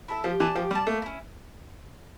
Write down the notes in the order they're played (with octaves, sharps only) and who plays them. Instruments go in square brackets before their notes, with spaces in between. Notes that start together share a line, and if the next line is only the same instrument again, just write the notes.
[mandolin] E4 A4 E5
[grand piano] F3 [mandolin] G4
[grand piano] E3 [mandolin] D5 A5
[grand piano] F3 [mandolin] G4
[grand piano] G3 [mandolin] D5
[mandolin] A5
[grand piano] A3 [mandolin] A#3
[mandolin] C#4 E4